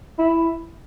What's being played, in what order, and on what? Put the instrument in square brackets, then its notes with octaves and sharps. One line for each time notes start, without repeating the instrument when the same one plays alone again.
[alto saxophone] E4